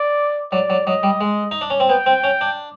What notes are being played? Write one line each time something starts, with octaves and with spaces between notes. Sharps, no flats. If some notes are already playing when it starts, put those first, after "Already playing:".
Already playing: D5
F#3 D5
F#3
F#3 D#5
G3
G#3
D#4
D4
C#4
C4
B3 G5
C4
C#4
D4